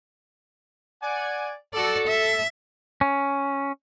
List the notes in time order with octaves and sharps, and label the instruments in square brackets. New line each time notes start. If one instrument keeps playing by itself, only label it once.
[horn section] D5 F#5 G#5
[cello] F#4 D5 [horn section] A4
[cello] E5
[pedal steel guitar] C#4